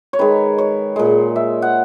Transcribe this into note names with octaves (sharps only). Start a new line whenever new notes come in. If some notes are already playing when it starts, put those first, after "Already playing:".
C#5
D#3 G#3 B4
C#5
A#2 G#3
E5
F#5